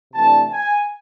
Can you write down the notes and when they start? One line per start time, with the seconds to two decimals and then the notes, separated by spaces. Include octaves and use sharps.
0.13 C3 E3 A3 D4 A5
0.51 G#5